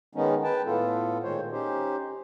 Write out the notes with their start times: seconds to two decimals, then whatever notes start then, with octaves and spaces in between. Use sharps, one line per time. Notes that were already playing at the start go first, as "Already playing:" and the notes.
0.15 D#3 G#3 B3 C#4 D#4
0.44 B4 G5 A5
0.66 A2 B3 F4 A4
1.23 A#2 D#3 G#3 C5 C#5
1.52 C#4 D#4 G4 C5